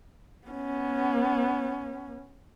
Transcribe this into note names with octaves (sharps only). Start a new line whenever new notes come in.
B3 C#4